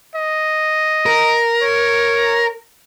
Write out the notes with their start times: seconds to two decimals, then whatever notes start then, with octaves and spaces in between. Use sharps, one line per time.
0.15 D#5
1.06 A#4
1.62 C#5